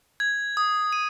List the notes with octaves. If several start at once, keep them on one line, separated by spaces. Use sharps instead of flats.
G#6
D#6
D#7